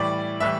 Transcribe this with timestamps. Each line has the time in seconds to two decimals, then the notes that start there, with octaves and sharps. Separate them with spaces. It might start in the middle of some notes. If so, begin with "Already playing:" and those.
Already playing: A2 E3 G3 D5
0.40 A2 E3 G3 E5